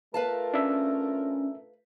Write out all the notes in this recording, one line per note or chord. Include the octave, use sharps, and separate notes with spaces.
A3 F4 A#4 B4 F5 A5
C#4 D4 E5